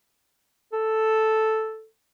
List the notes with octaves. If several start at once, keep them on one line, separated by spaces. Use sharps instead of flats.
A4